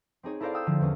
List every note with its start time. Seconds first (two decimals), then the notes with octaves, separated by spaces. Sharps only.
0.23 C4 D#4 G#4 C#5
0.40 E4 A4 A#4 C5 D5 F5
0.54 F5 G5 D#6 E6 G6
0.67 D3 F3
0.80 E2 C#4